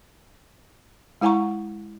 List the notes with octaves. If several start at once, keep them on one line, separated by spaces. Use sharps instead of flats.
G#3 E4 F#5 G#5 A#5 C#6